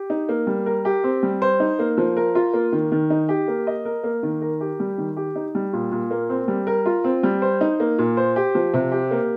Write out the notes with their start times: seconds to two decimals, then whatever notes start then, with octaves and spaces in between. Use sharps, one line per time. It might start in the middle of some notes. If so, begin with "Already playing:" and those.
Already playing: G4
0.10 D#4
0.29 A#3
0.47 G3
0.66 A#4
0.85 G4
1.04 C4
1.23 G3
1.42 C5
1.60 D#4
1.79 A#3
1.98 F3
2.17 A#4
2.35 F4
2.54 A#3
2.72 D#3
2.92 D#3
3.10 D#4
3.29 G4
3.48 A#3
3.67 D#5
3.85 A#4
4.04 A#3
4.23 D#3
4.41 A#4
4.61 G4
4.80 G3
4.98 D#3
5.17 G4
5.36 D#4
5.55 G3
5.73 A#2
5.92 A#2
6.11 A#3
6.29 C4
6.48 G3
6.67 A#4
6.86 F4
7.04 C4
7.23 G3
7.42 C5
7.61 D#4
7.80 A#3
7.99 A#2
8.17 C5
8.36 G4
8.55 F3
8.74 C3
8.92 G4
9.11 A#3